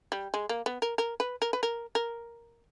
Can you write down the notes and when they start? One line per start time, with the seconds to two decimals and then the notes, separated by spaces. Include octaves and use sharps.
0.12 G3
0.34 G#3
0.49 A#3
0.66 B3
0.82 A#4
0.98 A#4
1.20 B4
1.42 A#4
1.53 B4
1.63 A#4
1.95 A#4